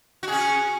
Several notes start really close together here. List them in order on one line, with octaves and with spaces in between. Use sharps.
F#4 G#4 C#4